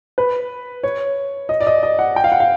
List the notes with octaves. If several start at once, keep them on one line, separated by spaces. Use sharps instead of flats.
B4
C#5
D#5
D5
D#5
D#5
F#5
G5
F5
F#5
F5